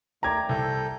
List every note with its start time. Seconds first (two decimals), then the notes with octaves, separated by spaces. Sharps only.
0.23 D#3 A3 D5 E5 G5 A#5 G#6
0.49 C2 A4 G6